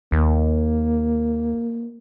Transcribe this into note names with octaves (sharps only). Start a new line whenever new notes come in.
D#2 A#3